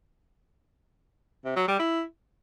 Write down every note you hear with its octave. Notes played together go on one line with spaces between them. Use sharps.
C3
F#3
G3
E4